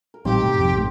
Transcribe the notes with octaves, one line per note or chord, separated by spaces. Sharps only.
A#4
A1 A#2 G3 C4 D#4 G4
G#2 B2 A3
F#1 F2 C3
A#1 G#2 A3